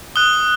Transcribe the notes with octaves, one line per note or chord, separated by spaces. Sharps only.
D#6 F#6 G7